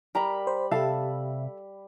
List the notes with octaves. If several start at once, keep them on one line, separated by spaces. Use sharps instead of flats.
G3 A#4 A#5 B5
C5
C3 G4 A4 E5 F5 A5